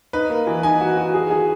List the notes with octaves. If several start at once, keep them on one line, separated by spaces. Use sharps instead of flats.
D#4 B4
A#3
E3
D#4 G#5
F#4
F#4
G#4
G#4